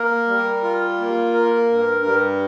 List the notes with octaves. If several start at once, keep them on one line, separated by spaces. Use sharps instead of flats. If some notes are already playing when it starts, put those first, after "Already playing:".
Already playing: A#3 A#4
G3
F4
A#3
A#4
G2
G3